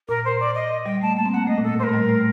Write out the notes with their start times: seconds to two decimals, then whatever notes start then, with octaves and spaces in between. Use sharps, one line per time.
0.08 A#2 A#4
0.25 C5
0.40 D5
0.54 D#5
0.85 G3 G5
1.01 A3 A5
1.17 A#3 A5
1.26 C4
1.33 A#3 F#5
1.47 A3 D#5
1.58 A#2
1.63 A2 A4
1.79 A#2 C5
1.83 A#4
1.89 A3
1.94 G3
2.09 A3